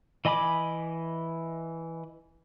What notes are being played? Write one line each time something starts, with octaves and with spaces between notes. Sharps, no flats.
E3 D#5 G#5 B5 D6